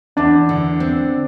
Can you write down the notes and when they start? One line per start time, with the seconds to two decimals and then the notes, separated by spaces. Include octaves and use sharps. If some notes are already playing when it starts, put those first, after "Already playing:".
0.17 E2 D4
0.49 D3
0.80 C4